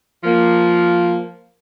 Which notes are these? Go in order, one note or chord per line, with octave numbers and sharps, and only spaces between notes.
F3 A#3